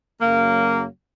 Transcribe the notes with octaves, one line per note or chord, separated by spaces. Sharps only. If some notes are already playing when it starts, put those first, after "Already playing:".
F#2 C#3 F#3 A#3